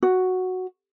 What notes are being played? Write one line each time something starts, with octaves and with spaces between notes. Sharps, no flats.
F#4